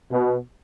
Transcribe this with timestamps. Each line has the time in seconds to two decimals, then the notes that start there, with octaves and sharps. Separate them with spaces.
0.11 B2